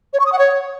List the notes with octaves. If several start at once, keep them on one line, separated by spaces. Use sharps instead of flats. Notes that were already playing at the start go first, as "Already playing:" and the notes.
C#5
C#6
D#6
F#5
C#5